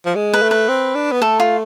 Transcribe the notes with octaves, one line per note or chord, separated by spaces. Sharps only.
F3
G#3
B4
A3
B4
C4
D4
B3
A3 A4
F4